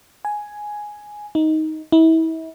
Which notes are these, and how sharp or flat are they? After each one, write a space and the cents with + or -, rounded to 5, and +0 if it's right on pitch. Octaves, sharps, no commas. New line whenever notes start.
G#5 +5
D#4 +10
E4 -35